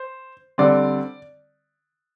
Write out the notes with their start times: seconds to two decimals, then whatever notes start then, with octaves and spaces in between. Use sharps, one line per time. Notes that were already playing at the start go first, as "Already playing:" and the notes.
Already playing: C5
0.58 D3 G3 C4 D5